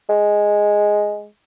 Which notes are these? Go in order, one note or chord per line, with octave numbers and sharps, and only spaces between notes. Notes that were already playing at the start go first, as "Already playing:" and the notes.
G#3